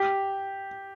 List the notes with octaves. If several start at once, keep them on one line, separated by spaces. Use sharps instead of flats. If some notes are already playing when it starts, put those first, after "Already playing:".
Already playing: G4